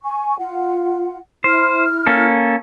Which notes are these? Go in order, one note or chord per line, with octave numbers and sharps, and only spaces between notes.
G#5 C#6
F4 F#5
E4 C5 F6
A#3 C#4 A4